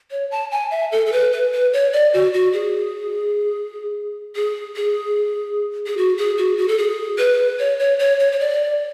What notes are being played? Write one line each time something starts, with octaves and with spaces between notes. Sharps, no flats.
C#5
A5
G#5
E5
A4
A4
B4
B4
B4
C#5
D5
F#4
F#4
G#4
G#4
G#4
G#4
F#4
G#4
F#4
F#4
A4
G#4
B4
C#5
C#5
C#5
C#5
C#5
D5